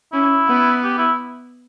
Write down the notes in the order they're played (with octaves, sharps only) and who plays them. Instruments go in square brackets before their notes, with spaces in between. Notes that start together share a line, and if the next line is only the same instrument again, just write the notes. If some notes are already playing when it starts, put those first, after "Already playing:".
[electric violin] C#4 [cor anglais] E4
[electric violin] B3
[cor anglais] G4
E4